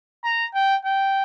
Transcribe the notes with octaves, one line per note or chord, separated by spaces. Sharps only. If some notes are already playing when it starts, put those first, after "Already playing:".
A#5
G5
G5